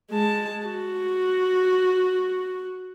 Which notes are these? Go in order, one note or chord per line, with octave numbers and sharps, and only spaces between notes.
G#3 A5
F#4